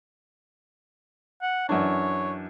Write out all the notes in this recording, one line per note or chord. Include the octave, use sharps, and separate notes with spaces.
F#5
F#2 E3 D4 C#5